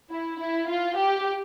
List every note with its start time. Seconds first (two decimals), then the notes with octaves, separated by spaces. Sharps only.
0.10 E4
0.39 E4
0.68 F4
0.96 G4